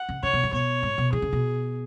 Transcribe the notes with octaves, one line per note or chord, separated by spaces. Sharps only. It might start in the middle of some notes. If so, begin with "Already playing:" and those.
Already playing: F#5
C#3
C#3 C#5
B2
G#2
B2 C#5
G#2
B2
E3 G#4
C#3
B2